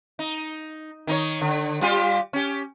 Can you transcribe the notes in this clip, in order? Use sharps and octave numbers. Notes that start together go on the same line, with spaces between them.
D#4
D#3 D#4 C#5
D3
G3 F4 G4
C#4 G4